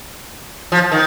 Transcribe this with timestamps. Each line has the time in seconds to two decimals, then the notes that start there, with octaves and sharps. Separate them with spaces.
0.72 F3
0.92 D#3